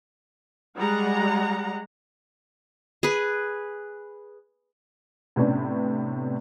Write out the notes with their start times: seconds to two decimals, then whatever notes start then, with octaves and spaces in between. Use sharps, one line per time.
0.76 G3 G#3 F#5 A#5
3.03 G#4 B4
5.36 A2 C3 B3 C#4 D4